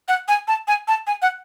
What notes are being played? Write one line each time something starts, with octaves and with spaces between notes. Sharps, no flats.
F#5
G#5
A5
G#5
A5
G#5
F#5